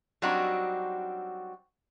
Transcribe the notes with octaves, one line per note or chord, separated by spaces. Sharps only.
F#3 G3 C4 D4 D#4 F#4